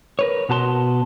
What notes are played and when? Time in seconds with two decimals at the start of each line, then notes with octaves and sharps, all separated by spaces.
0.19 A#4 B4 C#5
0.49 B2 B3 F#4 A5 B5 C6